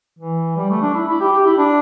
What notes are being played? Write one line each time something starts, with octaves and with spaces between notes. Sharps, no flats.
E3
G3
A3
D4
E4
E4
G4
G4
E4
D4